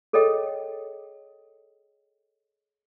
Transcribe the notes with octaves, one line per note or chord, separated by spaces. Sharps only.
G#4 A4 C#5 D#5 G5